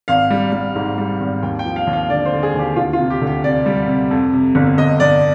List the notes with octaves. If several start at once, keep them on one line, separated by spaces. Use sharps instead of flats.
G#1 F5
G3
G3
G#2
G3
G#1
D#2 G5
G5
F3
F5
D#2
F5
D3 D5
C5
D3
G#4
D#2
G4
D2 F4
F4
C3
G4
D2
G4
C3 D5
G3
C3
F2
C3
G1
G1 D#5
G1 D5